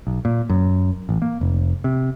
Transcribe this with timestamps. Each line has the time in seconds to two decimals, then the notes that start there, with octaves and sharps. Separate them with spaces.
0.07 B1
0.25 A#2
0.50 F#2
1.09 A1
1.22 A#3
1.41 F1
1.84 C3